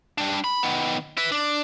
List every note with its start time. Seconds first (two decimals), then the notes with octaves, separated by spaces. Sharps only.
0.18 G3 D4
0.44 B5
0.63 D#3 B3
1.17 E4 B4
1.32 D4